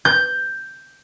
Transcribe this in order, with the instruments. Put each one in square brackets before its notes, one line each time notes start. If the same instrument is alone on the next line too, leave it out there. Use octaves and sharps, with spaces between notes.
[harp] G6